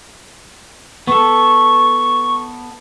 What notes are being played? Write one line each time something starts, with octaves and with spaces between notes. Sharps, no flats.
B3 A4 C#6